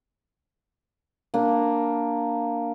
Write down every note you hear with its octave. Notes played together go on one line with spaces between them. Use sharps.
A#3 D4